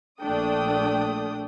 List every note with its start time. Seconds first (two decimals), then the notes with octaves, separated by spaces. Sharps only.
0.21 A#1 A3 D4 G5 D#6